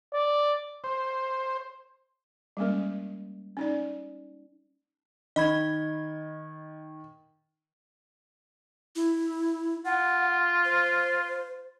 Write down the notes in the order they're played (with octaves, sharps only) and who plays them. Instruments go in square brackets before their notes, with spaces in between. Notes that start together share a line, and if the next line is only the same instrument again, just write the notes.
[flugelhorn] D5
[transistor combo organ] C5
[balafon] G3 G#3 A#3 C#4 A#4
C#4 D#4 D5
[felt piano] D#3 [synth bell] D#5 B5 G#6
[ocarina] E4
[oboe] F4 [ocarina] F#5
[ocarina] C5